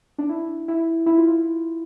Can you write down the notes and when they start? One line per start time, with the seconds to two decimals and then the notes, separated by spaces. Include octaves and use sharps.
0.18 D4
0.29 E4
0.68 E4
1.06 E4
1.18 F4
1.28 E4